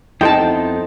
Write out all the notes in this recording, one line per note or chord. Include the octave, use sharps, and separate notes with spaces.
F2 B3 D#4 E4 A4 C5 G5 A5